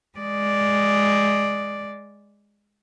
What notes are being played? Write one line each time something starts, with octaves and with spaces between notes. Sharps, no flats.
G#3 D5